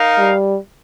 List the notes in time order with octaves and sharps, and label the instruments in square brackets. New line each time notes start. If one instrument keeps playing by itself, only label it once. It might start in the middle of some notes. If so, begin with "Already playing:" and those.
Already playing: [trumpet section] D#4 A#4 F5
[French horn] G3